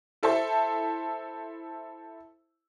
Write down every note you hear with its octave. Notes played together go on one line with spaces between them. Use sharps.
E4 A4 C5 E5 A5